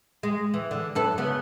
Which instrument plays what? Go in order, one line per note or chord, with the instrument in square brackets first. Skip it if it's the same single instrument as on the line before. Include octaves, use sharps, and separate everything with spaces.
[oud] G#3
E3
D3
F#2 A4 B4
C#3 B3